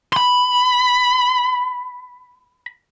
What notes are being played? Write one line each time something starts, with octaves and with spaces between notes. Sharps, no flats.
B5 C6